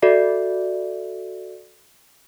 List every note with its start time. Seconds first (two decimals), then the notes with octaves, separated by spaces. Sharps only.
0.02 F#4 A4 D5 E5